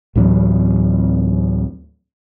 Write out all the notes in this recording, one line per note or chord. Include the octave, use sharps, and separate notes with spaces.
D2 A2 E3 F#3